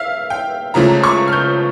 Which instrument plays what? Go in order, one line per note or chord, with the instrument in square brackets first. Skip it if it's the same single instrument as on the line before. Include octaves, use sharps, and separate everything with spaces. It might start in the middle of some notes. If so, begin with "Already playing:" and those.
Already playing: [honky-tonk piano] E5 F5
G5
C#2 C#3 F3 A3 A#5
C#6
F6
G6